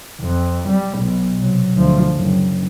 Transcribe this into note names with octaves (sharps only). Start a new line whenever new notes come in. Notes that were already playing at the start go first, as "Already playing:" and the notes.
F2
G3
B1 B2
C3 F#3
D2 F3
F#1